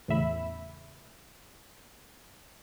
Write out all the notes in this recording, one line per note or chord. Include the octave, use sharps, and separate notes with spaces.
E2 A2 C#3 E5 B5